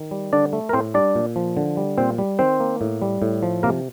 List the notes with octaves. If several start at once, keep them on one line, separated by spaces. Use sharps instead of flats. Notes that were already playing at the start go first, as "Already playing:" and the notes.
Already playing: D#3
G3
D3 D4 D5
A3
A#4
A2 C4 C5
G3 D4 D5
A#2
F3
D3
G3
A#2 C4 C5
G3
D#3 C4 C5
A#3
A2
G3
A2
F3
C3 A#3 A#4